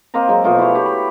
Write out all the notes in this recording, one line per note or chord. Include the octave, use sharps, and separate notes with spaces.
A#3 C4 D#5 A#5
F#3 G#3 C4
B2 F3 A3
E4 G4 C5 C#5
F#4 G4 C5 C#5
B5